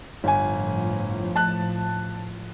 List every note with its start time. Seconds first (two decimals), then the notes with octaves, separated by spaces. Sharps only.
0.24 G1 A2 F3 G#5
1.36 A5 F#6